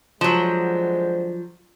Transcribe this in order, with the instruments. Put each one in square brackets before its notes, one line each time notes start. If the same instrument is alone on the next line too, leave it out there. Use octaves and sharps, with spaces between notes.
[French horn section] D3 G#3 C5 [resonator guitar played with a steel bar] F3 F#3